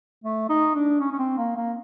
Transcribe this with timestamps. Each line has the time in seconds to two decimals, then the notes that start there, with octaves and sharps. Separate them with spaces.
0.24 A3
0.49 D#4
0.75 D4
1.00 C#4
1.12 C#4
1.19 C4
1.38 A#3
1.56 A#3